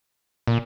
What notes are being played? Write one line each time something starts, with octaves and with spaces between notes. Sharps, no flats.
A#2